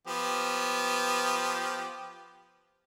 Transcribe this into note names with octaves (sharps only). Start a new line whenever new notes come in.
F3 B3 G4